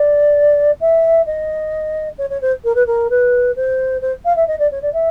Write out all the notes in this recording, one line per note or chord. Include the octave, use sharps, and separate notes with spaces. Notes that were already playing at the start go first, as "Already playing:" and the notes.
Already playing: D5
E5
D#5
C#5
C#5
C5
A#4
B4
A#4
B4
C5
C5
F5
E5
D#5
D5
C#5
D5
E5